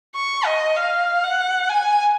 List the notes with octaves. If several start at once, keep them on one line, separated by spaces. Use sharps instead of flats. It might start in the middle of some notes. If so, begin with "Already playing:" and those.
C#6
D#5
F5
F#5
G#5